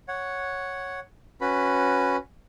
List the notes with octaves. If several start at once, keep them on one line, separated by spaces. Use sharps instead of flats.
C#5 F#5
C#4 F#4 B4 B5